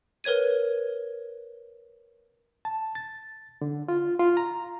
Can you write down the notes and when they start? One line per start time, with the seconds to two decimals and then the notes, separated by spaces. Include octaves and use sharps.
0.24 A#4 B4 C#5 G#6 D#7
2.65 A5
2.95 A6
3.61 D3
3.88 F4
4.19 F4
4.37 A#5